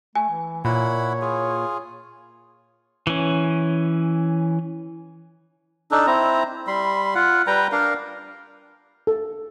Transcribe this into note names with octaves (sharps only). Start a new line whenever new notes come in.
A3 G#5
E3
A#2 E4 C#5 F#5 B5
F4 G#4
E3 C#4
D4 D#4 A4
C4 E4 A#5
G3 B5 C6
F4 F#5
G3 B4 G5 A#5
D4 A#4 F5
A4